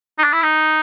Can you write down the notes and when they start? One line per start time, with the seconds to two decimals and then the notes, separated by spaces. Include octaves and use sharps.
0.19 D#4
0.24 D4
0.33 E4
0.43 D#4